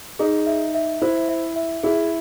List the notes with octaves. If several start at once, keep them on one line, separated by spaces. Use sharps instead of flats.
D#4 G#4
E5
E5
E4 C5
E5
E5
E4 G#4